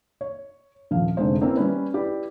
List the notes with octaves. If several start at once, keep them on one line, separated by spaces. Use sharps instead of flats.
C#5
D#1 F3 F5
F1 D3 G#3 D#4 C5
A#3 C4 C#4 E4 A#4 B4
G3 C#4 B4
E4 G4 B4 D5